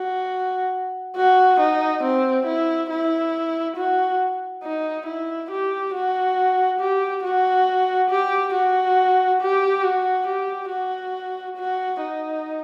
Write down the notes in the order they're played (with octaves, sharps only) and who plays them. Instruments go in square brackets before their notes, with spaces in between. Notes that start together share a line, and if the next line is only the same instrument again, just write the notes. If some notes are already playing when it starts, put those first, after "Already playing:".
Already playing: [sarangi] F#4
F#4
D#4
C4
E4
E4
F#4
D#4
E4
G4
F#4
G4
F#4
G4
F#4
G4
F#4
G4
F#4
F#4
D#4